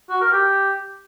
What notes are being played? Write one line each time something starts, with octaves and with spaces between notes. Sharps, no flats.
F#4
A#4
G4